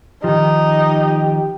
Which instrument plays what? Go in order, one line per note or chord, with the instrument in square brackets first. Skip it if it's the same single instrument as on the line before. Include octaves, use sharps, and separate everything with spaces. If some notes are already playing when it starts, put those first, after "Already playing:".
[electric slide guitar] D#3 F3 [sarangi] D#4 [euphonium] G4